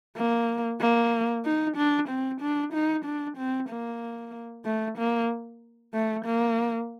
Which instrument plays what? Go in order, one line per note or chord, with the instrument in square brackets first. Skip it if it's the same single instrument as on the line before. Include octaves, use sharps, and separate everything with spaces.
[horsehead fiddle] A#3
A#3
D#4
D4
C4
D4
D#4
D4
C4
A#3
A3
A#3
A3
A#3